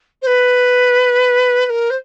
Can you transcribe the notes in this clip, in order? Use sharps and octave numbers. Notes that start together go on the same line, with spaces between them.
C5
B4
B4
A#4
C5